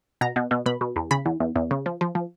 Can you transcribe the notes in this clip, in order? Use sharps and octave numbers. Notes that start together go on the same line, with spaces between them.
B2 A#5
B2
B2
B2 B5
B2
E2
C#3 B5
E2
E2
E2
C#3
F3
F3
F3